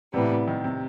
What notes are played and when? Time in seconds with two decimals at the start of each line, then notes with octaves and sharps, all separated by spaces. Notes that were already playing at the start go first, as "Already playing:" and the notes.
0.13 A2 C3 E3 G3 B3
0.48 D#3
0.64 C3